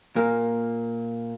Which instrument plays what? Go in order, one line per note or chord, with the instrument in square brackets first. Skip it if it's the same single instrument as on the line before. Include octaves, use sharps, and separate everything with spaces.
[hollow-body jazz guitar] A#2 A#3